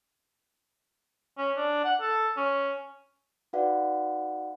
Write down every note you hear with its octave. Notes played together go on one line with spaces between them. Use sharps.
C#4
D4
F#5
A4
C#4
D#4 F#4 B4 D5 F5 F#5